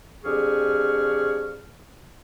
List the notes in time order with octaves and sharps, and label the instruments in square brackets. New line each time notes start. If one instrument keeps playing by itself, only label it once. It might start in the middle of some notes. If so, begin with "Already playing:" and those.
[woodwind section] F2 D4 G4 G#4 C#6 F6